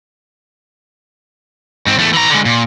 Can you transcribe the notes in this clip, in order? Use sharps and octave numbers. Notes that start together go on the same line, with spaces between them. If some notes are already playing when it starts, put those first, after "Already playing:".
G#2 C4
E2 A3
E3 A#5
D3 G#3
A#2